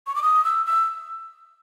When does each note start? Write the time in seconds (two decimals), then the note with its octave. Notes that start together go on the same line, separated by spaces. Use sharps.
0.07 C#6
0.16 D6
0.22 D#6
0.44 E6
0.66 E6